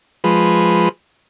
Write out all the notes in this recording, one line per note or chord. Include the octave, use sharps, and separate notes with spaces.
F3 G#3 B4